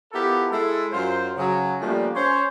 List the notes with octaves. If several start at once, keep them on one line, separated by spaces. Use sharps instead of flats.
B3 E4 F4 G4 A4 A#4
G#3 E4 A4
F#2 F#3 F4 C5
C#3 F#3
F3 G3 A3 A#3 C#4 D4
C#4 C5 C#5